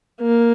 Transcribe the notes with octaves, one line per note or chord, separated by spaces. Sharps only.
A#3